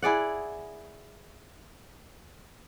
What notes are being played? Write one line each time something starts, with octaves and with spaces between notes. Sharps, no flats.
E4 G#4 D5 F#5